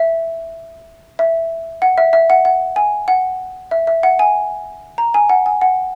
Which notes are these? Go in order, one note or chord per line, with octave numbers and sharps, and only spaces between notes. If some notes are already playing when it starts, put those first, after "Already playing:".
Already playing: E5
E5
F#5
E5
E5
F#5
F#5
G#5
F#5
E5
E5
F#5
G#5
A#5
G#5
F#5
G#5
F#5